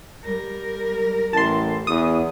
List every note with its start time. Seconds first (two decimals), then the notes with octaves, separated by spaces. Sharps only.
0.24 G3 A#4
1.33 A1 A5 C6
1.87 E2 D#6